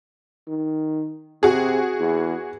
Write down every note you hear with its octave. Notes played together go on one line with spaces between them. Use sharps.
D#3
C3 F#4 G#4
E2